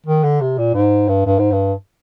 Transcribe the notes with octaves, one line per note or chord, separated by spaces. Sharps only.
D#3
D3
C3
A#2
G#2
G2
G2
G#2
G2